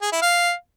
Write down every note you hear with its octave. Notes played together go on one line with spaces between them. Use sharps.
G#4
E4
F5